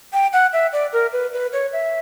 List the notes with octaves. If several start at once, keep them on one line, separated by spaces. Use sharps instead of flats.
G5
F#5
E5
D5
A#4
B4
B4
C#5
E5